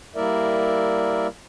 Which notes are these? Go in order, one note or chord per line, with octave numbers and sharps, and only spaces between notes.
G3 A#3 E4 A#4 D5 E5